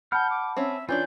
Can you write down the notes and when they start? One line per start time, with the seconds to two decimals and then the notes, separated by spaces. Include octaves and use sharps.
0.12 F#5 A5 B5 F6 G6
0.30 D6
0.57 C4 C#4 E5
0.89 E3 C#4 D4 F4 G6